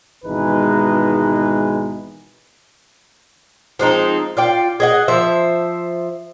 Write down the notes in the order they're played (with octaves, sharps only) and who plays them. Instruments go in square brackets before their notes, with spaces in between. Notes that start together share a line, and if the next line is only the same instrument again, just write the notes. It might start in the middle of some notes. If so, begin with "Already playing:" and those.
[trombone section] G#1 B2 E3 G#3 D#4 B4
[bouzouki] F3 G#3 C4 D#4
F4 D5 G5
G#4 D#5 F#5
F3 C5 E5